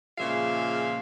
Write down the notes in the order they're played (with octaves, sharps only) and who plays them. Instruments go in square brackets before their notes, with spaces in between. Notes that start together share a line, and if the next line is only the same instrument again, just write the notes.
[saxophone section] A#2 C#3 F3 G#3 E5 F5